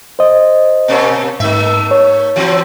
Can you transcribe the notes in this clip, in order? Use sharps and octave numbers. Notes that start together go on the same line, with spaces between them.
C5 D#5
B2 A#3 C#4
G#2 A3 D#4 E5
C#5
E3 F#3 C4